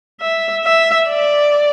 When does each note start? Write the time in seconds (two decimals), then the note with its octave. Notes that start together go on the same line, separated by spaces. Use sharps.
0.21 E5
0.64 E5
1.08 D5